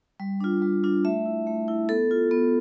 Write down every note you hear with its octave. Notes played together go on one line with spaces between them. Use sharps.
G3
D4 F4
G3
D4 F4
A3 E5
E4
A3
E4
B3 A4
F4
B3